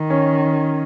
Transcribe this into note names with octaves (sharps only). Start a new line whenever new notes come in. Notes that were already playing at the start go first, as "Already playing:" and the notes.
Already playing: D#3
C#4